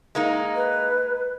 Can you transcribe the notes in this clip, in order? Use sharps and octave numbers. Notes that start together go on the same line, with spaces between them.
G#3 A#3 D#4
B4